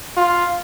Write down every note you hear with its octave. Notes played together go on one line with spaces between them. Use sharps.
F4